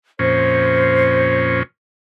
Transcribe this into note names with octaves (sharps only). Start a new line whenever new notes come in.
F2 A#2 C#4 C5